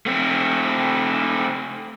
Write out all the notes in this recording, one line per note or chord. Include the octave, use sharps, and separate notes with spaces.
A3 C4